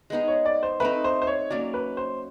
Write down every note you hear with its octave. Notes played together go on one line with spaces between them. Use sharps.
G#3 B3 D#4 G#4
C#5
D5
C5
A3 C4 D#4 B4
C5
C5
C#5
F#3 A#3 C#4 D5
B4
C5